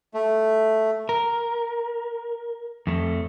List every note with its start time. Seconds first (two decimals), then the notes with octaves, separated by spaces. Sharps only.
0.14 A3
1.09 A#4
2.87 F2 A3